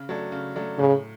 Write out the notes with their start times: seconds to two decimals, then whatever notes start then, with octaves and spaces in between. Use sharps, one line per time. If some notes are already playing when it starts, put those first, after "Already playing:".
Already playing: C#3
0.09 F#3 A3 D4
0.32 C#3
0.56 F#3 A3 D4
0.79 A2 C#3